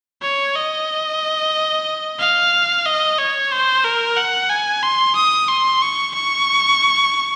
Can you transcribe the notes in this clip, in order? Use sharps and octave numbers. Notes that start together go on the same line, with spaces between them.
C#5
D#5
F5
D#5
C#5
C5
A#4
F#5
G#5
C6
D#6
C6
C#6
C#6